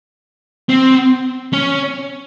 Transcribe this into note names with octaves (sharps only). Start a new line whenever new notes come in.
C4
C#4